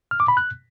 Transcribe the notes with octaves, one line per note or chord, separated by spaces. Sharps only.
F6
D6
B5
F#6